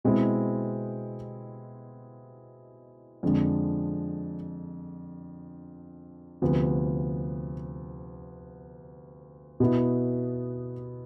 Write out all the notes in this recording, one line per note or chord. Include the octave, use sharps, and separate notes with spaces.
B2 G#3 C4 E4
F2 D3 G#3 D4
D2 C3 F3 B3
B2 B3 E4